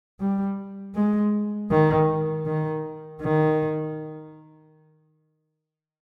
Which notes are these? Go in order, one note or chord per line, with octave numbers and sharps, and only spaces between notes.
G3
G#3
D#3
D#3
D#3